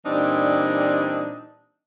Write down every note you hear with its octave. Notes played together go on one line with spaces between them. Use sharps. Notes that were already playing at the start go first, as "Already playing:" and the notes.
A#2 E3 G3 C4 D4 D#4